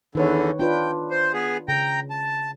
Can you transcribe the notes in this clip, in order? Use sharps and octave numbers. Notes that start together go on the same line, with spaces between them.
E2 D3 D#3 B4 C#5
D4 F4 B4 G5
C5
B3 G#4
C#3 G5 A#5
A5